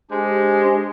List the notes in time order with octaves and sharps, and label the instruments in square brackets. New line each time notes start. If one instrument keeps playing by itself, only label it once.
[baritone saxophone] G#3 [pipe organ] D4 G4 C5